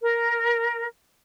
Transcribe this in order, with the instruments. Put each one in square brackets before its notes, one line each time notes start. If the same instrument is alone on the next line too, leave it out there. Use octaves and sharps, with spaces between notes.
[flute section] A#4